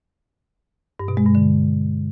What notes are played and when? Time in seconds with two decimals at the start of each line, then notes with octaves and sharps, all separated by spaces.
1.00 G2
1.08 B2
1.17 G#3
1.26 G2
1.35 D3